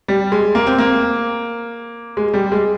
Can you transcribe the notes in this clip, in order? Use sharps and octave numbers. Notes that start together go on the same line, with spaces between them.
G3
G#3
A#3
C4
A#3
G#3
G3
G#3